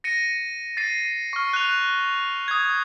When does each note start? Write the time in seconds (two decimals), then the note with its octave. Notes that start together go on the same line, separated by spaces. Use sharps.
0.04 A#6 C#7 D#7
0.77 A6 C7 D#7
1.33 C#6 F6
1.53 F#6 F7
2.48 D#6 G#6